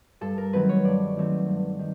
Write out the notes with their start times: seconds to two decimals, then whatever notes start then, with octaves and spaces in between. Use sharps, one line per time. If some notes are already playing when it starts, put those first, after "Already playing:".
0.21 G2 A4
0.38 A#4
0.53 D#3 F#3 A3 C4 B4
0.69 C#5
0.84 G2 D5
1.16 D#3 F#3 A3 C4
1.48 G2
1.79 D#3